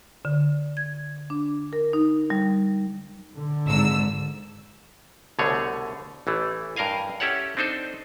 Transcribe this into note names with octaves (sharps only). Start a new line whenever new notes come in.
D3
G#6
D4
A#4
D#4
G3
D3
G#1 G#2 E6
C2 B2 D3 A3 G#4 C#5
A1 E3 A3
G2 A#4 D#5 F5 G#5
C#4 E4 G4 A4 C#5 F#5
C4 D4 D#4 A4 C5